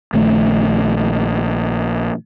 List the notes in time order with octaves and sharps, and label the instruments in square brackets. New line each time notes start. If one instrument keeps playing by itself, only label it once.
[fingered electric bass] A#1 D#3 A3